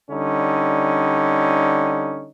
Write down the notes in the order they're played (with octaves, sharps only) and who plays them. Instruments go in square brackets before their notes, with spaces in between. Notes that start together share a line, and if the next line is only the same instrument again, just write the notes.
[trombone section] D3 G3 C#4 D#4